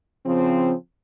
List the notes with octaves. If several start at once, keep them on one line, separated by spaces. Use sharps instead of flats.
C#3 F3 C4